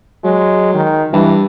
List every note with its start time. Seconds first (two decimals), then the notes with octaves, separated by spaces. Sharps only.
0.24 F#3 G#3
0.74 D#3
1.13 G2 E3